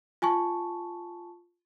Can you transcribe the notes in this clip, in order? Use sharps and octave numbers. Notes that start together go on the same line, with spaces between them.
F4 G#5 A5 C#6